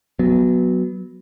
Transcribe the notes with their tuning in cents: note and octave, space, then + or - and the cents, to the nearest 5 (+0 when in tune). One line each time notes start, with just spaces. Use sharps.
F#3 +0 B3 -5